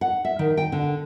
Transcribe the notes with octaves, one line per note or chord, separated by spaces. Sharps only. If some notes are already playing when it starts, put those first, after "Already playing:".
F#5
E5
D#3
G5
D3